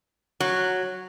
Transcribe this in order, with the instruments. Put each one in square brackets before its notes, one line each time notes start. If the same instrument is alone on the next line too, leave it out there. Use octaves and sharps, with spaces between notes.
[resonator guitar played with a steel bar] F#3